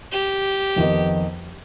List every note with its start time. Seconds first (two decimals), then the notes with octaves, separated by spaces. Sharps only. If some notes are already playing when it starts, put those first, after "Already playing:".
0.12 G4
0.76 F2 D#3 B3 D#4 B4